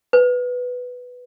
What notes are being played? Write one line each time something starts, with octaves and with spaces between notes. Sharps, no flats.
B4